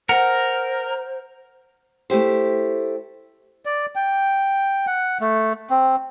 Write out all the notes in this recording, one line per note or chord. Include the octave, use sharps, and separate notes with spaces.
A#4 C5 F#5
A3 E4 G4 C5
D5
G5
F#5
A3
C4